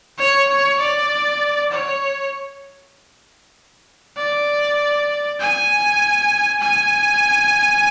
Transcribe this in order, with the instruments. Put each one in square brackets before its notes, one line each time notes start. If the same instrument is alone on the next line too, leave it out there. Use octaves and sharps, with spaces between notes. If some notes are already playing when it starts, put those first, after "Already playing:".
[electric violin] C#5
C#5
D5
C#5
D5
G#5
G#5